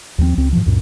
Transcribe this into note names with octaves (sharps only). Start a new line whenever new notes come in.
D#2 F3 A3 C4
C#2 C4
G#2 E3 F3
C#2 F#2 A#2